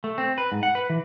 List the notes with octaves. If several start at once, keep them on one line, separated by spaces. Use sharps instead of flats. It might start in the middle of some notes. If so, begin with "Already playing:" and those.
A3
C4
B4
G#2
F#5
B4
E3